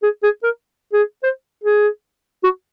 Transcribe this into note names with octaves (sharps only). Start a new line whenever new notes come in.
G#4
G#4
A#4
G#4
C5
G#4
F#4